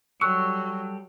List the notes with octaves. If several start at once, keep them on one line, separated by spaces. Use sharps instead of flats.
F#3 G3 A4 C#6 E6 F#6